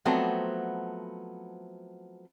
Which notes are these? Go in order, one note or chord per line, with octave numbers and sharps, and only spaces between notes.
F3 F#3 A3 B3 C4